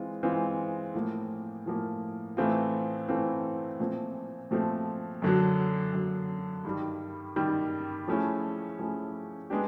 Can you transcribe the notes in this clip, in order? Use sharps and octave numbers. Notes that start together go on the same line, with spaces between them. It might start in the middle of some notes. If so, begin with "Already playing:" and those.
Already playing: E3 G#3 C4 F4
E3 G#3 C4 F4
A2 F3 A#3
A2 F3 A#3
A2 E3 A3 C4 F4
A2 E3 A3 C4 F4
A#2 F3 A3 C4
A#2 F3 A3 C4
F#2 D3 F#3
F#2 D3 F#3
G2 D#3 G3
G2 D#3 G3
F3 A3 C#4 E4 G#4
F3 A3 C#4 E4 G#4
G#3 B3 D4 G4